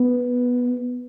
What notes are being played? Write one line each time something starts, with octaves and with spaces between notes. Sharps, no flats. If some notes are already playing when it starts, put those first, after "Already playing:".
Already playing: B3